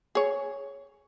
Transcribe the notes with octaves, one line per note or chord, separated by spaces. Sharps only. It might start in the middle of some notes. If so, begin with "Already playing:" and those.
G#4 C#5